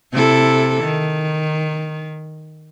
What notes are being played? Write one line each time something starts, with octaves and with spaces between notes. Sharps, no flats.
C3 E4 A4
D#3